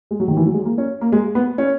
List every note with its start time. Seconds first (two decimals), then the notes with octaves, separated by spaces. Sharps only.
0.11 G#3
0.20 F#3
0.28 D#3
0.37 E3
0.46 F#3
0.54 G#3
0.65 A#3
0.78 C#4
1.01 A#3
1.12 G#3
1.35 B3
1.58 C#4